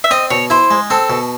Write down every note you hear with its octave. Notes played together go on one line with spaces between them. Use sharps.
E5
C4 D#5
B2 C#5
E4 C5
G#3
C4 A4
B2